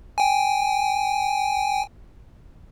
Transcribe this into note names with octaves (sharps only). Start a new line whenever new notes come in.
G5 G#5